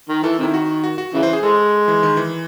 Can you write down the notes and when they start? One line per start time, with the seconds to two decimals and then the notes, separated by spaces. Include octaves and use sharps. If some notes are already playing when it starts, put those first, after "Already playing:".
0.09 D#3
0.23 E3 A4
0.39 C3 D#3 E4
0.54 F#4
0.84 F#4
0.98 F#4
1.14 C#3 E3
1.23 C5
1.33 G#4
1.43 G#3 A4
1.88 E3
2.03 D#3
2.17 E3